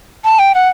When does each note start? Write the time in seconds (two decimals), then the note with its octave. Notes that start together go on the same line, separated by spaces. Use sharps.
0.24 A5
0.39 G5
0.55 F#5